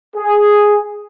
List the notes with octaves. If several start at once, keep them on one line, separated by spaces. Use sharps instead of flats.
G#4